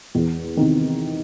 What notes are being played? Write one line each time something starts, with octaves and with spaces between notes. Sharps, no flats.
E2
C3 D#3